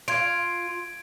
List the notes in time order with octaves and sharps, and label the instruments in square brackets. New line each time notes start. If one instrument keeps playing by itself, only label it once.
[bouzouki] F4 [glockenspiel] G#6 D7